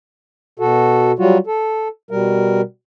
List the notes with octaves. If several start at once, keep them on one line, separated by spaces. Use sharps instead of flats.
B2 F#4 A4
F#3 G3 F4 F#4
A4
B2 G3 A#4